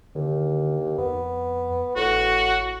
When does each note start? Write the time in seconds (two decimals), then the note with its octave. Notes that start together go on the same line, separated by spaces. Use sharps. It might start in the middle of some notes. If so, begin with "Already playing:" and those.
0.15 D#2 D3
0.98 F2 B3
1.96 G#1 A2 F#4